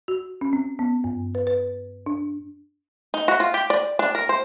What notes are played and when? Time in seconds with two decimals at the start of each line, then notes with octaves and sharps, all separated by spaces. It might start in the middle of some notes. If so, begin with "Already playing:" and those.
0.08 F#4
0.41 C#4
0.53 C4
0.79 B3
1.04 G2
1.35 B4
1.47 B4
2.06 D4
3.14 D#4
3.28 F#4
3.40 F4
3.54 G4
3.70 D5
3.99 D4
4.15 A#4
4.29 C5